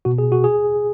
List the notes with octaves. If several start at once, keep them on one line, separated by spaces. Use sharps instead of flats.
B2 F#4
G#4
F#4
G#4